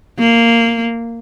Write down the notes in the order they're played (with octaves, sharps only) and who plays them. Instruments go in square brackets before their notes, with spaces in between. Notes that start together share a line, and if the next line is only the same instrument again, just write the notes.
[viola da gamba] A#3